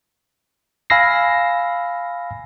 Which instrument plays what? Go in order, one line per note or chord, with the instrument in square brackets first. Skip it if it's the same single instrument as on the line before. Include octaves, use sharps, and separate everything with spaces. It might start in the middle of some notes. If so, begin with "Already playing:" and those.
[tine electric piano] F5 G#5 B5 E6 A#6 C7